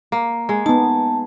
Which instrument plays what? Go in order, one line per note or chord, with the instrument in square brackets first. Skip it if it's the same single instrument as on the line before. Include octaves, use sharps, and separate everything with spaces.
[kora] A#3
G#3
[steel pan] B3 D#4 [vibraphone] A5